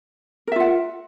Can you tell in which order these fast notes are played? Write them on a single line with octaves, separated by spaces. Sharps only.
A#4 E5 F4 F#5